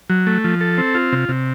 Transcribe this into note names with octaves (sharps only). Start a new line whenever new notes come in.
F#3
A3
F3
A4
C4
F4
C3
C3